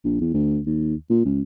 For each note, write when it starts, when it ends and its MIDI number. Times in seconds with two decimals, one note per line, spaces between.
0.04 0.17 34
0.21 0.33 40
0.34 0.60 38
0.66 0.95 39
1.10 1.22 46
1.25 1.42 37